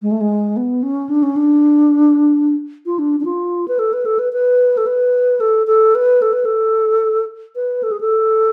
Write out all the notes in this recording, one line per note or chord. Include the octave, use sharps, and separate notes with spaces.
G#3
A3
G#3
B3
C#4
D4
C#4
D4
F4
D4
D4
F4
B4
A4
B4
A4
B4
B4
A4
B4
A4
A4
B4
A4
B4
A4
B4
A4
G#4
A4